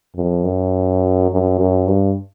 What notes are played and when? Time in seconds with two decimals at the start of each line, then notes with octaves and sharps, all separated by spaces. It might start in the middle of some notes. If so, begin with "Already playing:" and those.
0.15 F2
0.44 F#2
1.30 F#2
1.59 F#2
1.87 G2